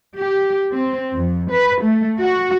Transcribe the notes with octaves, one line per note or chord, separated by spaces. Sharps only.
G4
C4
F2
B4
A3
F#4